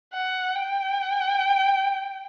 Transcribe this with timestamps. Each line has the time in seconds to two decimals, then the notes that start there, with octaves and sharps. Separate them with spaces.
0.13 F#5
0.55 G5